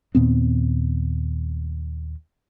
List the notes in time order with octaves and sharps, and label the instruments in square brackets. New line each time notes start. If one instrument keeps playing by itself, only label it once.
[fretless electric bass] D#2 A#2 B3 C4